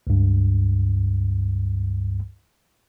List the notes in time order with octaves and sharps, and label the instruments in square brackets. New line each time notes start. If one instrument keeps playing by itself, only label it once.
[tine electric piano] C#2 G2